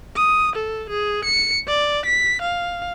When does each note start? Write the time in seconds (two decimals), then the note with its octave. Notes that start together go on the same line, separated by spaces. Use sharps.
0.16 D#6
0.56 A4
0.90 G#4
1.24 C#7
1.67 D5
2.06 B6
2.42 F5